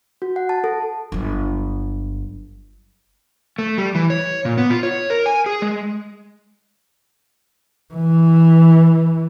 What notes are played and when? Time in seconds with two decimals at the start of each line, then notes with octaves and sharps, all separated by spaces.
0.22 F#4
0.36 F#5
0.49 A5
0.64 A4
1.12 G1 F#3
3.59 A3
3.78 G3
3.95 E3
4.10 C#5
4.45 A#2
4.58 B3
4.70 F4
4.83 C#5
5.10 A#4
5.26 G#5
5.46 G#4
5.62 G#3
7.94 E3